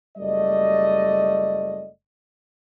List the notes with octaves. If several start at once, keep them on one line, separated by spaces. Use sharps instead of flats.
F#1 G3 A3 D5 D#5